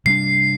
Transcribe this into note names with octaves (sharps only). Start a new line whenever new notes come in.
C3 G3 A#3 D4 C7